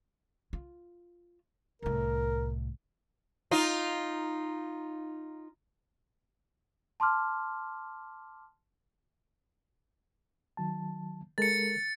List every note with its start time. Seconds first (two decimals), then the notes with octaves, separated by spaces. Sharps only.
0.53 F4
1.82 C2 A2 A#4
3.51 D#4 F4
7.00 A5 C6 D6 F6
10.57 D#3 F#3 A5
11.38 G#3 A4 A#4 A6 C#7